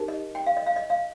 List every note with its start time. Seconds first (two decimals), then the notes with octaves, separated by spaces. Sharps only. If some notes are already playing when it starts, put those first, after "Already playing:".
Already playing: D#4 G4 A#4
0.08 D#5
0.35 G5
0.46 F5
0.57 D#5
0.66 F5
0.76 D#5
0.90 F5